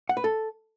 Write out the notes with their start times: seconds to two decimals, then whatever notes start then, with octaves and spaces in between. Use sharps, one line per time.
0.09 F#5
0.17 B4
0.24 A4